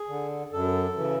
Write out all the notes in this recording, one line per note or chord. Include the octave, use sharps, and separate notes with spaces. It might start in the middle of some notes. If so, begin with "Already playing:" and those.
Already playing: G#4
D3
F#2 A4
C#3 E3